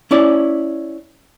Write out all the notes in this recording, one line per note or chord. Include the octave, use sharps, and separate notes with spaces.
C#4 E4 D5